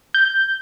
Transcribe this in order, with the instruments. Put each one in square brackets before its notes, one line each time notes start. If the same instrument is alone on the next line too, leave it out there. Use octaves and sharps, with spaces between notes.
[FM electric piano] G6